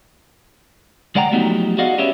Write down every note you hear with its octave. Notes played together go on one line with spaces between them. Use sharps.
D2 G#3 D5 F#5 G5 A#5
F3 F#3 A3 B3 D#4 G4
F#4 G#4 D5 D#5 F5 F#5
B3 C#4 G4 G#4 C#5 E5